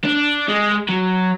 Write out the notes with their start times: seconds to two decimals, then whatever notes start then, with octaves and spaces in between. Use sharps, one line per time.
0.04 D4
0.48 G#3
0.89 F#3